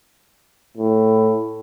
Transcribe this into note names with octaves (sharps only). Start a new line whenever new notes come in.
A2